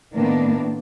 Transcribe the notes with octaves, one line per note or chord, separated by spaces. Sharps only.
A2 D#3 A#3 B3 D4